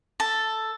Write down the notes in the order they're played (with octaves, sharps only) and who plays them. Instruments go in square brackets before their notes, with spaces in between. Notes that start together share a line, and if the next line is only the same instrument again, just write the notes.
[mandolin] A4